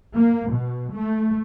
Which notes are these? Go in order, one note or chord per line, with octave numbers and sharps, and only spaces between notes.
A#3
B2
A3